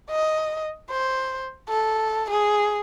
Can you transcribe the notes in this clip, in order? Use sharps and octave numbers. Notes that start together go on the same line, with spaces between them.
D#5
C5
A4
G#4